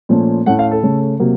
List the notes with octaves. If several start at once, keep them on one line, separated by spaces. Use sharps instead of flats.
A#2 F3 A3 C#4
A2 A3 C#4 F#5
F5
A4
C#3 A3 C#4
C3 F#3 A#3